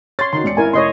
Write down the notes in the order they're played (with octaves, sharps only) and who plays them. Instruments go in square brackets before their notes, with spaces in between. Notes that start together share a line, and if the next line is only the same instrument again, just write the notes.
[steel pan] C#5 C6 [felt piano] A6
[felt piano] D#3 D#4 F#4 [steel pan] C6
[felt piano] E1 D5 C#7
[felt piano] G#1 [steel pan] E4 A#4 G#5
[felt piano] F1 [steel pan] C#5 D#5 C6